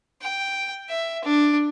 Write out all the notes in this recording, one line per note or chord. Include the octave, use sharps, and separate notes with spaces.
G5
E5
D4